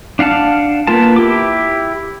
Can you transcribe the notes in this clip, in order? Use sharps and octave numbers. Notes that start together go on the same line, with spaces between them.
D4 F5 F#5 A5 F6
A#3 B3 F4 A#4 A5
E4 G4 D6